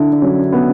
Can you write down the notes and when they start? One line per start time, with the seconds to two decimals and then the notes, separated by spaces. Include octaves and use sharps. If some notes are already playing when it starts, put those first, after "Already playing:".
Already playing: D3 D4 E4
0.13 D4
0.22 F#3 C#4
0.53 B3